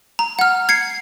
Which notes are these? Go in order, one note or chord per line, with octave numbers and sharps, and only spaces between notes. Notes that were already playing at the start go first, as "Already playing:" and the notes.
A#5
F#5 F6
G#6 C7 C#7